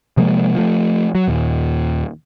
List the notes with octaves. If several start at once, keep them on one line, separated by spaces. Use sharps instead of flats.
C3 F3 G#3 A#3
F3 A3
F#3
D#2 A#2